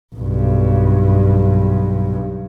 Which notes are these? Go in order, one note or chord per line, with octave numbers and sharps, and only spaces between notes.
B1 G2